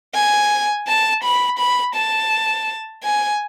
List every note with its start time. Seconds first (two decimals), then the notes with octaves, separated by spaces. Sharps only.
0.15 G#5
0.87 A5
1.23 B5
1.59 B5
1.95 A5
3.04 G#5